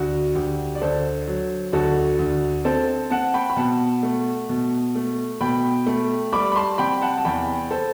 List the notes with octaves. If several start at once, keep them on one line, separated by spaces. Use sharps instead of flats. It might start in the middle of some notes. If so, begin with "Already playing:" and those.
Already playing: D2 F#4
D2 G4
D5
D2 A4 C5
F#3
D2 F#4 A4
D2
C4 A4 C5
C4 F#5 A5
G5 B5
B5
B2 F#5 A5
A3
B2
A3
B2 G5 B5
A3
G3 B5 D6
B5
A5 C6
C3 G5 B5
F#5 A5
A5
E2 G5 B5
A4 C5